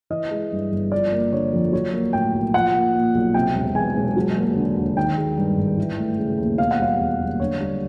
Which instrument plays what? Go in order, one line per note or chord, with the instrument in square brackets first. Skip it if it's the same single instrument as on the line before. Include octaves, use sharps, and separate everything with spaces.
[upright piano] E3 D#5
G#3
G2
G1
F3 D5
A#3
D3 C#5
F2
F#3 C#5
A#3
A2 G5
B1
F3 F#5
A#3
A#2
B1
C3 G5
E1
E2 G#5
E1
F#3
A#3
D3
D#2
D#3 G5
G#3
G2
G#1
E3
A3
C#3
D#2
B2 F5
F#5
G3 F5
E2
F#1
D3 C#5
G3